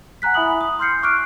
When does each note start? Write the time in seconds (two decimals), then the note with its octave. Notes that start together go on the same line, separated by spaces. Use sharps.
0.22 F#5 G#5 A#5 F#6 B6
0.34 E4 E5 G#5 B5 D#6 F#7
0.61 D#6
0.79 C6 F6 G6 C7 C#7
1.03 C#6 D6 F6 F#6 C7 D7